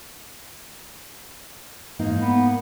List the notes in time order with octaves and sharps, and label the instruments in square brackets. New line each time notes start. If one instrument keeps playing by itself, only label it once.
[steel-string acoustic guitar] G#2 A#3 D#4
[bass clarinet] B3